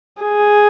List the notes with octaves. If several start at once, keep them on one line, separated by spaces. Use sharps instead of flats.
G#4